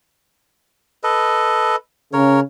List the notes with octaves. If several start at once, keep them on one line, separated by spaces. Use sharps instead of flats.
A4 B4 D#5
C#3 A#4 C#5